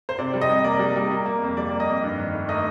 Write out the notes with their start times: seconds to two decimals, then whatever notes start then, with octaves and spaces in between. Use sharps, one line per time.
0.09 C5
0.18 C3 D5
0.34 G3
0.41 D#5
0.49 C3
0.64 A#3 D5
0.79 G3
0.96 G3
1.11 A#3
1.26 A#3
1.42 F2
1.57 G3 D5
1.72 A#3
1.80 D#5
1.87 F2
2.04 G2
2.18 D#3
2.34 A3
2.49 A3 D#5